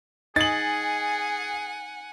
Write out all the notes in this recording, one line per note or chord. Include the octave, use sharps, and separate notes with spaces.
D#4 G#4 D#5 F#5 G#5 A6 F#7